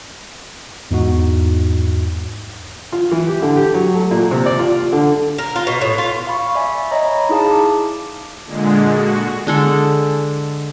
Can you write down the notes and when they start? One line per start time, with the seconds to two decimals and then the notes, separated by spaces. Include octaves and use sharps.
0.91 E2 G#2 D#4 F#4
2.93 F4
3.12 E3
3.27 G4
3.42 D3
3.56 G4
3.74 F#3
3.95 A3
4.11 A#2
4.31 C3
4.46 D5
4.59 F4
4.92 D3
5.38 A#4
5.56 F4
5.67 B2
5.81 A2
5.98 F4
6.27 F5 B5 C#6
6.55 D5 E5 G#5
6.91 C#5 D#5 A#5 B5
7.29 D#4 E4 G#4 F5 A5
7.51 D6
8.45 A#2 D3 G#3
8.87 F#4
9.47 D3 G#3 A4